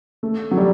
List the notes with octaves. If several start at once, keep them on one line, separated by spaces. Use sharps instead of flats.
A3
F#3
G3